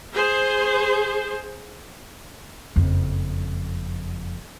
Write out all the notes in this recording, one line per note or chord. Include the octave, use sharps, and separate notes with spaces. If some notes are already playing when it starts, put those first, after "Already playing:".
G#4 C5
F#1 F2